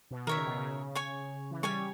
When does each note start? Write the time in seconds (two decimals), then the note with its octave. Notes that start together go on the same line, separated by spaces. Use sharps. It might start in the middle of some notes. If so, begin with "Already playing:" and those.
0.11 B2
0.27 D#3 A#4 C#5 E5
0.37 C#3
0.46 B2
0.57 C#3
0.95 C#5 G#5 C#6
1.51 E3
1.63 G3 C#5 G#5 C#6